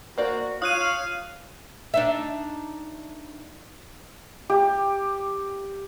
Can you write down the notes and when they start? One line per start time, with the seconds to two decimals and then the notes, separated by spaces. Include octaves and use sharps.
0.18 A#3 F#4 C5 D5
0.62 F4 C#5 F5 D#6 F#6 D#7
1.94 D4 D#4 E5
4.50 G4